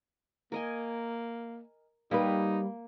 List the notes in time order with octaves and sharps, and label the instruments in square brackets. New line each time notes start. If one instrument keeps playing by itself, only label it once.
[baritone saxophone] A#3 [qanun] A#4 D#5 G#5
[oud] G3 B4 [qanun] A#3 [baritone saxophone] D#4